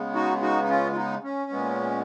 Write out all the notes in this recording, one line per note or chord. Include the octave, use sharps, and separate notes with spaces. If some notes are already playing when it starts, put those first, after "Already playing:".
Already playing: C#3 G#3 B3
D#4 F#4
D#4 F#4
D#4
C#4 F4
F4
B3 D#4
C#4
A#2 G#3 B3